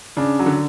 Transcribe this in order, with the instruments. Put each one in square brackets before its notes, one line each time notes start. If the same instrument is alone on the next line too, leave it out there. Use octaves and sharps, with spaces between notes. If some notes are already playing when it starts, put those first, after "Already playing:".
[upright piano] C#3 [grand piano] D4
[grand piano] F#3
[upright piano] D3